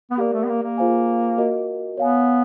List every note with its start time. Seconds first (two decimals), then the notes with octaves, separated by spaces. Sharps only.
0.11 B3
0.18 A#3 G4 A#4 D5
0.33 A3
0.43 B3
0.48 A#3
0.63 A#3
0.78 F4 G#4 C5 F5 G#5
1.38 F#4 A#4 D#5
1.97 B3 C#5 F5 G#5